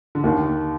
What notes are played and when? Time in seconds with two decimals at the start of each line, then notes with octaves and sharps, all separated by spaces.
0.15 D3
0.24 D#2 D#3